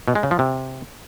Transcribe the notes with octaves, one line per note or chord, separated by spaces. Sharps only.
B2
G#3
C#3
F3
C3